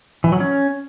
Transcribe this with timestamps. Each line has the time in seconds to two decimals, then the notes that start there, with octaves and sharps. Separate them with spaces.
0.24 E3
0.32 F#3
0.40 C#4